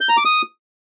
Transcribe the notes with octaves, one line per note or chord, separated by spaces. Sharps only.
G6
A#5
D6
D#6